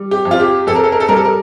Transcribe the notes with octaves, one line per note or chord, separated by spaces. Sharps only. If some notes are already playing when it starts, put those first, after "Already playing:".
Already playing: G3
G4
F2
F4
G4
F2 A4
A#4
A4
A#4
A4
G3 A#4
A4
A#4